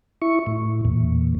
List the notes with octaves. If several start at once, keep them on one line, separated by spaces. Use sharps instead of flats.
E4 C#6
A2
E2 A#2